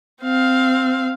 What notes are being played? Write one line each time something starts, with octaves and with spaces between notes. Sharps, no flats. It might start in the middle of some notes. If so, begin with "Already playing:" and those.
C4 F5